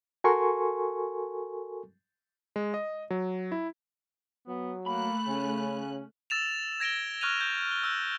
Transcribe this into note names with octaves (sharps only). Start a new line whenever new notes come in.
F#4 A4 A#4 G#5 C6 C#6
G#3
D#5
F#3
E4
F#3 B3
A3 A#3 B5 F#6
C#3 C#4
E6 A6 E7 F7
G#6 A#6 D7 E7 G7
C#6 F6 F#6 G#6 D#7 F7
G6
G7
E6 F#6